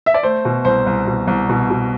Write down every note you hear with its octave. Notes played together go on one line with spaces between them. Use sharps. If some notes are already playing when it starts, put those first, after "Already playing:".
E5
D5
A3 C5
B2
C2 C5
C2
B2
C2
B2
B2